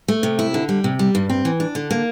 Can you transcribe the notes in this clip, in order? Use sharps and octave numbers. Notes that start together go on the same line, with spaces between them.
A3
C3
E4
D3
G3
C3
G3
G2
C4
E3
D4
D3
A#3